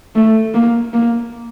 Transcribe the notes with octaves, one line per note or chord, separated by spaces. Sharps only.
A3
A#3
A#3